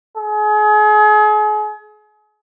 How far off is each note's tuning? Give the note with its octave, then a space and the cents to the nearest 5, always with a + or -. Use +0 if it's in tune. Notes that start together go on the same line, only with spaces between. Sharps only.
G#4 +35